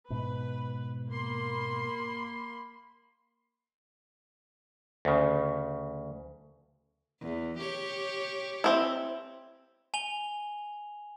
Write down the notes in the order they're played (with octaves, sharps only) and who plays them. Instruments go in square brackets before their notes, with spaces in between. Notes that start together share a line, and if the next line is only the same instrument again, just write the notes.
[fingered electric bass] G#2 B2 [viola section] B4
[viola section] A#3 B5 C6
[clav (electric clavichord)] D2 C#3
[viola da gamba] E2
G4 C#5
[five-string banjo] C4 E4
[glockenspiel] G#5 F7 G7